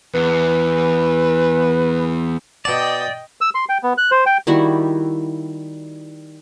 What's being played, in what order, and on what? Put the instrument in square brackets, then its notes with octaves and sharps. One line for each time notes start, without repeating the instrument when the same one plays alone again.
[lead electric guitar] E2 [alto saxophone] B4
[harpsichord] B2 A5 [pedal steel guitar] D5 [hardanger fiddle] D#5 G5
[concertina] E6
C6
G5
B3
F#6
C5
G5
[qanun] D#3 G3 E4 F#4